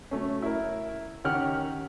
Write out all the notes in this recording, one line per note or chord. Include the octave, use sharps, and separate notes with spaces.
F#3 A3 C#4
E4 A#4
D#3 C#4 G4 F#5 G5 F6